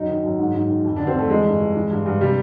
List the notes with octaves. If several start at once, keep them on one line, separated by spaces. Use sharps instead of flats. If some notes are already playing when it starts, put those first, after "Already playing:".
Already playing: F#2 D#4
D#3
F#2
G#2
G#2
D#3
F2
D3 D4
C4
F2 A3
E3 G#3
G2
E3
E3
G2
G2
C3 G3